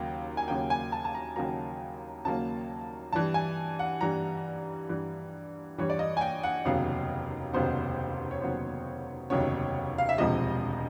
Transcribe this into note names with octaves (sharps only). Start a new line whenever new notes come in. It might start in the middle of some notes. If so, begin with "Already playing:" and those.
Already playing: D#2 C#3 F#3 A#3
G#5
D#2 C#3 F#3 A#3 G5
G#5
A5
A5
A#5
D#2 C#3 F#3 A#3 A#5
D#2 C#3 F#3 A#3 A5
G2 E3 G3 A5
G#5
F#5
G2 E3 G3 A#5
G2 E3 G3
G2 E3 G3 C#5
D5
D#5
G#5
G5
F#5
F1 D#2 C#3 F#3 B3 F5
F1 D#2 C#3 F#3 B3 C5
C#5
F1 D#2 C#3 F#3 B3 C5
F1 D#2 C#3 F#3 B3 C#5
F5
E5
E1 D2 C3 F3 G#3 D#5